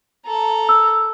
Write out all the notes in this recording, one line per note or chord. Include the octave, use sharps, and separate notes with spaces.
A4 A#5
E6